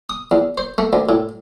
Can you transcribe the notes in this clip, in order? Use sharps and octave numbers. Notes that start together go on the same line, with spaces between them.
D#6
E2
C5
A3
D2
A2